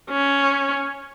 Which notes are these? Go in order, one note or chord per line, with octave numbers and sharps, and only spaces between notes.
C#4